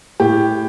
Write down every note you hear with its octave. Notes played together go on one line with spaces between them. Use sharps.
A2 G4